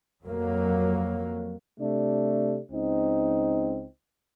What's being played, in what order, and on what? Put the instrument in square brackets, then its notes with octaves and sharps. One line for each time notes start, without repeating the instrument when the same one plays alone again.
[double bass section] F2 F#3 A#3
[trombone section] C3 A3 D4
C#2 C4 D#4